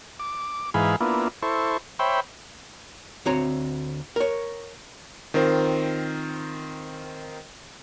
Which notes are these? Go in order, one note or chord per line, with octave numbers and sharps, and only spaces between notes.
D6
G#2 E3 D#4 G#4 F5 B5
A#3 B3 D4 E4 F4
E4 A4 C5 C#6
C5 C#5 E5 G5 B5
D2 C4 F#4 C#5 A#5
A#4 C#5
D#3 C4 F4 A#4 C5